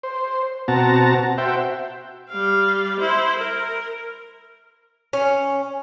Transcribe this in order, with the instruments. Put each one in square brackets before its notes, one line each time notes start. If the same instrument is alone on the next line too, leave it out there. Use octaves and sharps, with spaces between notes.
[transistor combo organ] C5
B2 C4 F#4 A5 A#5
F#4 C5 E5 G5
[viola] G3 F5
E4 C5
A#4
[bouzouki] C#4